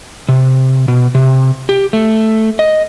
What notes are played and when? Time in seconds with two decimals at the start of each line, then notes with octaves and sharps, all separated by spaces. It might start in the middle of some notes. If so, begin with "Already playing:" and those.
0.29 C3
0.88 B2
1.15 C3
1.69 G4
1.93 A3
2.59 D#5